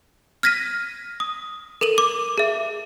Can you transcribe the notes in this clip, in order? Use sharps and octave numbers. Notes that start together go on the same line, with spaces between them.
F6 G#6 A#6 B6 D#7
D#6
A4 A#4 D#7 F#7
D6
G#4 E5